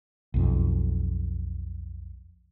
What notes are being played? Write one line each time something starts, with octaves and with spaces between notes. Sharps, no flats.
B1 F2